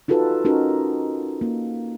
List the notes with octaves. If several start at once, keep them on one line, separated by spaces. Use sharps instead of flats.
D#4 F4 F#4 A4 B4
C#4 D#4 F#4 A#4
A#3